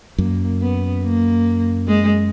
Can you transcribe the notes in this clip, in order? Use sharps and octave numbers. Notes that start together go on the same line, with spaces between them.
F#2 A#3
B3
A#3
G#3